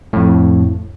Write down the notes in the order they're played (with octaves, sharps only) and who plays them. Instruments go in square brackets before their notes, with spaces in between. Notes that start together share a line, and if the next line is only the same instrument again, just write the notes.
[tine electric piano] F2 A2